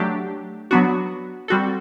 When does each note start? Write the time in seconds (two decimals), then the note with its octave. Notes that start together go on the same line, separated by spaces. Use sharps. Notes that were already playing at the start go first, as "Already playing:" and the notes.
Already playing: F#3 A3 D4 G4
0.71 F#3 B3 D4 F#4
1.48 G3 C4 F#4 A4